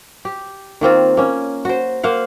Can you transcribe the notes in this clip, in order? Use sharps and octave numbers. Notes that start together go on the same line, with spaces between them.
G4
D#3 A#3 C4 F4
A#3 C#4
F#4 C5
A#3 C5 F5 F#5